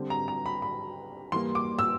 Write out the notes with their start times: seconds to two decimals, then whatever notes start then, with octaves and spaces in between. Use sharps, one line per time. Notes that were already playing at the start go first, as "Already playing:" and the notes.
Already playing: D3 G3 C4
0.10 A#5
0.28 A#5
0.46 B5
0.62 B5
1.32 E3 G3 A#3 C6
1.55 D6
1.79 E6